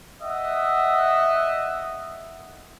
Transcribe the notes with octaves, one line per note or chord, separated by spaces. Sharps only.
D#5 E5 F#5